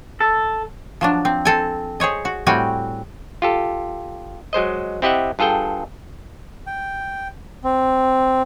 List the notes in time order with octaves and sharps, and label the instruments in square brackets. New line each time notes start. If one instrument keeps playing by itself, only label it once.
[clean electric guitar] A4
[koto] F3 F#3 D4
C4
C4 A4 G#5
G#4 C5 C#5 D#5
F#4
A2 G3 C4 F#4 G5 G#5
[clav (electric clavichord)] F4 G4 A4
F#3 G#3 C5 D#5
C4 E4 G4 D#5 E5 F#5
G2 F4 G#4 A4 G5
[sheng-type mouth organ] G5
C4